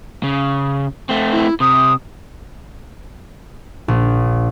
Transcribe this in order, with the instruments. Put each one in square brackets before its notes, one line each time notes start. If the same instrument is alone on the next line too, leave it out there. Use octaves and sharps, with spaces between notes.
[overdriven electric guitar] C#3
A3 C4
[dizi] E4
[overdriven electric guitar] C3 [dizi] D#6
[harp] A#1